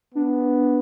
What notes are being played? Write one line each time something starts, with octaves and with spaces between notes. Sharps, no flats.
B3 D4